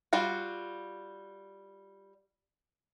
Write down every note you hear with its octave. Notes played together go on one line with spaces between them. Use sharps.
G3 F4 F#4